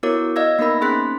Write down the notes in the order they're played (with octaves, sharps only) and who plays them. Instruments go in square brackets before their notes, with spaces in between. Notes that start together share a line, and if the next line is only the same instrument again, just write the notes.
[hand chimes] B3 E4 F#4 A#4 C#5 D6
D5 D#5 F5 E6 G#6 A#6
A#3 B3 D#4 A#4 B5 A#6
C4 C#4 G#4 C6 F#6 B6